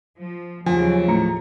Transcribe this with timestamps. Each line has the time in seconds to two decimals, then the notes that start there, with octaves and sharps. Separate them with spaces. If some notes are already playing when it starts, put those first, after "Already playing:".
0.17 F3
0.66 D#2 C#3 F3 F#3 G#5
1.08 A2 A#5 C#7